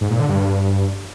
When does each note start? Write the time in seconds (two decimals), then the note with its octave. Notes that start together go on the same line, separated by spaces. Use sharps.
0.01 G#2
0.10 A#2
0.20 D3
0.29 G2